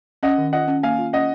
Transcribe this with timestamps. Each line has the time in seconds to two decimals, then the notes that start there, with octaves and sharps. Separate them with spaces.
0.23 C#4 D#5 F#5
0.38 D#3
0.53 F4 D#5 F#5
0.68 C#4
0.83 A#3 F5 G#5
0.99 F4
1.13 C#4 D#5 F#5